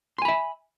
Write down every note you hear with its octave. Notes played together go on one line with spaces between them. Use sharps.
E5 G#5 B5 C6